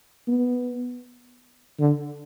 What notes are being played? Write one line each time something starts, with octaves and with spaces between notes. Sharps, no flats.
B3
D3